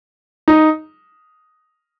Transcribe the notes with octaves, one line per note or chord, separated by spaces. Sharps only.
D#4